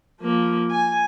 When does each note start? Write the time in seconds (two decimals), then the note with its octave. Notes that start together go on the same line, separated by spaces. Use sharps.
0.20 F3 A#3
0.71 G#5